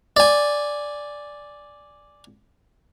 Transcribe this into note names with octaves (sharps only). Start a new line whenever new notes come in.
D5 G#5